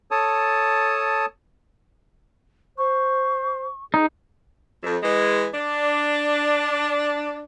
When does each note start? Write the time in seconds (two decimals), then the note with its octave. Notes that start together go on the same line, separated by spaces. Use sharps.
0.11 A4 C#5 A5 D#6
2.78 C5 C#6
3.94 D#4 G#4
4.83 F2
5.02 E3 G#3
5.54 D4